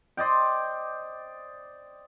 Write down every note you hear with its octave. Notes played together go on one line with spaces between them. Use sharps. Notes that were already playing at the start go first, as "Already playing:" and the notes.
C5 D5 D#5 G5